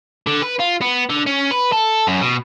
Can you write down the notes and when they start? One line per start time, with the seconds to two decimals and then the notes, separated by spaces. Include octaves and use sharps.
0.27 D3
0.43 B4
0.60 F4
0.81 B3
1.10 D3
1.27 C#4
1.51 B4
1.72 A4
2.07 F#2
2.21 B2